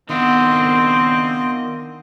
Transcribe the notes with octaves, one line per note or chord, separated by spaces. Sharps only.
D#3 B3 C4 D4 F4 D#5 F#5